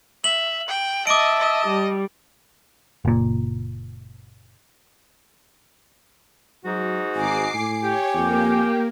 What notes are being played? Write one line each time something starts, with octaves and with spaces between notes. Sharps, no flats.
E5 F#7
G5
D#5 E5 A5 D6 D7
D#5
G3
F#1 A#2
G#2 F#3 D#4 F#4
G#1 G#5 D6 C7
A2 G#5
G4 C#5
F2 A#3